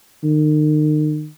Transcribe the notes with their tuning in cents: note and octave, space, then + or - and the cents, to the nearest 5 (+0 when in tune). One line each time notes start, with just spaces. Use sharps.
D#3 -35